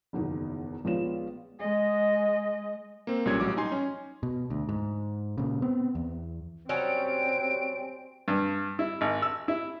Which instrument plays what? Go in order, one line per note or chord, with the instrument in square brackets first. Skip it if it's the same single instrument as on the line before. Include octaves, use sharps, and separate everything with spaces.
[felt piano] F#1 E2 B2 D#3
A#1 G#3 B3 F4 C#5 E7
[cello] G#3 D#5
[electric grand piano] A#3 C4
B1 A#2 G3 C#4 G#6
A1 F#3 G3 D6
D#4 G#5 C6
C#4
[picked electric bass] B2
D2
G#2
A#2 C#3
B3 C4
E2
[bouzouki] F#3 G3 C#4 [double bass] C4 [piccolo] D7
[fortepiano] G2
E4
G#1
E6
E4